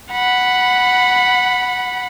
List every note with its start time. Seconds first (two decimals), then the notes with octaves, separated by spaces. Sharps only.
0.12 F#5 B5